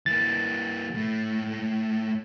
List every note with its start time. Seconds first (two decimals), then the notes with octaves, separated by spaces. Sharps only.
0.06 E3 A#3 A6
0.95 A2 A3